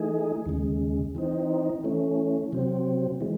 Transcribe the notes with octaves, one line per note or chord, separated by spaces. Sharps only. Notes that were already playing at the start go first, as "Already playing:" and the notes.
Already playing: E3 A3 D#4 G#4
D#2 C#3 G#3
E3 C4 D#4
E3 A3 C#4
C3 F#3 C4
E3 G#3